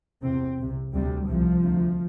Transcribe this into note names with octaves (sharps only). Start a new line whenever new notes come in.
E2 C3 C4
C2 C3
D2 C3 G3
C2 C3 F3
D2 C3